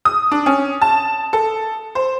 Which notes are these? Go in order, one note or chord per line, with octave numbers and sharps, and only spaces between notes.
D#6
D4
C#4
A5
A4
C5